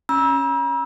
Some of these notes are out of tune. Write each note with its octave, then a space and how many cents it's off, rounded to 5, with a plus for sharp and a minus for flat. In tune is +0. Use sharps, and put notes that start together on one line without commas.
C#4 -5 A#5 +45 E6 -10